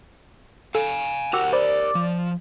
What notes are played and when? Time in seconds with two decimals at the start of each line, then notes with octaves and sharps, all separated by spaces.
0.75 A4 F5 G#5
1.33 F#4 G4 A#4 G5 D6 E6
1.53 C5 D5 B5 D6
1.95 F3